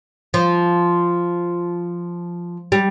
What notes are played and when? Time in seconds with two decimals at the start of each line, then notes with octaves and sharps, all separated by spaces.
0.34 F3
2.72 G3